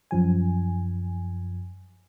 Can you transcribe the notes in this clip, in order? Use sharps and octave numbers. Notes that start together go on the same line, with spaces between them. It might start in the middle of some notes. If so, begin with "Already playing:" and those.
F#2 F3 G#5